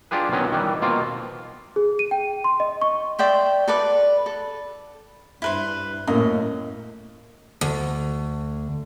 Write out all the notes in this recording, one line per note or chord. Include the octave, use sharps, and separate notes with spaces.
D4 F4 G4 G#4 B4
B2 D#3 F#3 B3 C#4 D#5
D#3 E3 G3
B2 A#3 C4 F4
G#4
D#7
G5
C6
D#5
C#6
D5 E5 G5 C6
A4 B4 D5
A4
G2 E4 B4 C5
F#2 A2 A#3 D#5
D2